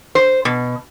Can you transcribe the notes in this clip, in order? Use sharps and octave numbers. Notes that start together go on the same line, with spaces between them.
C5
B2